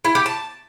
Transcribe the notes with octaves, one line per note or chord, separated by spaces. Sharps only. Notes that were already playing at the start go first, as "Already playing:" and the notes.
E4
G4
A5